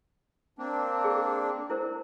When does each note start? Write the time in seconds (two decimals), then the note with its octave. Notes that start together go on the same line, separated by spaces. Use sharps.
0.59 A#3 C4 D4
1.04 G#4
1.70 E4 A#4 C5